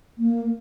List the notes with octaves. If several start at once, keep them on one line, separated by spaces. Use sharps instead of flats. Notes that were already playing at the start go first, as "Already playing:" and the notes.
A#3